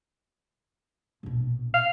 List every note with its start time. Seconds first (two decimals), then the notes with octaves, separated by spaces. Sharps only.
1.23 A#1 B2
1.74 F5